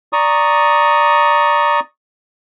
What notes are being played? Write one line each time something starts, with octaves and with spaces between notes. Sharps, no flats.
D5 A#5 C#6 D#6